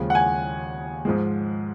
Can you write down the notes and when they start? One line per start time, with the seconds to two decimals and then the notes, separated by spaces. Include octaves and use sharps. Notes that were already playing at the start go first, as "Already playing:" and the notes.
Already playing: D#2 C#3 F3 G#3
0.10 F#5
0.15 G#5
1.05 G#2 F3 G#3